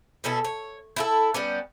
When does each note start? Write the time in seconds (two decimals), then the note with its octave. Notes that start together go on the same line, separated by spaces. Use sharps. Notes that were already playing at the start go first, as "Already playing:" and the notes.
0.24 B2 C#4 E4 A4
0.44 C#5
0.96 E4 F4 A4
1.34 G3 B3 C#4